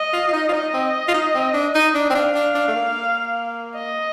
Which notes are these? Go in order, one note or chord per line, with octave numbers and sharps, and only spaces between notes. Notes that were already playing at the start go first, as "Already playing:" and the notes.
Already playing: D#5
F4
F4
D#4
F4
D#4 D#5
C4
F4
D#4
C4
D4
D#4
D4
C4
D4 F5
D4
D4
A3
A#3
D#5